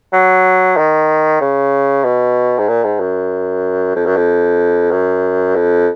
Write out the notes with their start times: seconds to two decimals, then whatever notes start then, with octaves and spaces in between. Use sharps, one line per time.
0.13 F#3
0.77 D#3
1.41 C#3
2.05 B2
2.58 G#2
2.68 A#2
2.84 G#2
3.00 F#2
3.95 F2
4.06 F#2
4.16 F2
4.92 F#2
5.55 F2